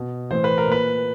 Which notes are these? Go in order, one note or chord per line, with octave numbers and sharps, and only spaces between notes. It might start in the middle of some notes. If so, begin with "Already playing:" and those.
Already playing: B2
A2 E3 C5
B4
A#4
A#2 B4